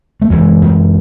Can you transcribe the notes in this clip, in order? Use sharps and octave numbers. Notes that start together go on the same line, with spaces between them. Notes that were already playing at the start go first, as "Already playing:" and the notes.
A3
F#2 E3 G#3
F#2